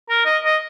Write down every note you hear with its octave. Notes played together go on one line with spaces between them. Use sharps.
A#4
D#5
D#5